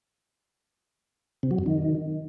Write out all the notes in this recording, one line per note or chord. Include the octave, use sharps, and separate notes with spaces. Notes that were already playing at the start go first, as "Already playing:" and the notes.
C3
F#3
F#2
D#3